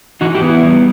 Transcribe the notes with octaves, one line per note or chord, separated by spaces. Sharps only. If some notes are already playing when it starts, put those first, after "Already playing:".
E3 D#4 F#4
E4 G4
B3
E4
G3